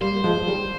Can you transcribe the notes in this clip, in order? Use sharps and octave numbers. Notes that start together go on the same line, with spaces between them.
G3 A#3 C5
A#3
F3 G#3
D#3 G3